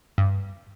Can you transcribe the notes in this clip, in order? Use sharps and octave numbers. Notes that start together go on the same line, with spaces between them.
G2